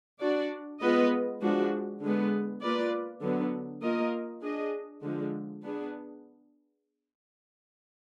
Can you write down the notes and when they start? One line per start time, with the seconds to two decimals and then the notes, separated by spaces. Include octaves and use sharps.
0.20 D4 F#4 D5
0.80 G#3 B3 F4 B4 D#5
1.40 F3 G#3 D4 F#4
2.01 D3 G#3 B3
2.61 A#3 F4 B4 D5
3.21 D3 F#3 B3
3.82 A#3 F4 A#4 D#5
4.42 D4 G#4 D#5
5.02 D3 F3 G#3
5.63 B3 D4 G#4